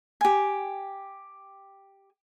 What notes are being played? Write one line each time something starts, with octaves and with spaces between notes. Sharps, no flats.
G4 G#5